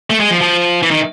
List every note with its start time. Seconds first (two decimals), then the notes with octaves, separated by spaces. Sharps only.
0.10 A3
0.20 G#3
0.31 F3
0.41 F3
0.83 E3
0.91 D#3